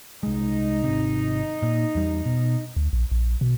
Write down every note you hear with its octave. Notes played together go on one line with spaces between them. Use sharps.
C2 G#3 D#4
G#1 C3
A#2
E2 G3
B2
D2
A#1
A#1
B2